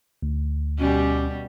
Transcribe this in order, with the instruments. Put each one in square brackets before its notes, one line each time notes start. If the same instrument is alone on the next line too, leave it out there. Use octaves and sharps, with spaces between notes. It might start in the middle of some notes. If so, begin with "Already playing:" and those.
[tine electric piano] D2
[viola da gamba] B2 G3 G4 [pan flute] C#4